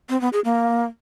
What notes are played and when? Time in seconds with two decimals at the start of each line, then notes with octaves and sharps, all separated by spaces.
0.09 C4
0.21 B3
0.33 G#4
0.45 A#3